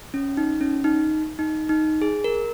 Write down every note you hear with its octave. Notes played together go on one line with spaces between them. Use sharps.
C#4
D#4
C#4
D#4
D#4
D#4
G#4
A#4